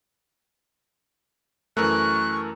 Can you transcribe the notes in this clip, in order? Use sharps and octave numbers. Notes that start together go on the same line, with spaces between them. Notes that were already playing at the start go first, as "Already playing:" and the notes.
F#2 E3 A3 A#4 C#6 F#6